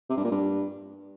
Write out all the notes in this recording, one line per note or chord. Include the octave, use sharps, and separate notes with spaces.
C3
G2
A#2
G2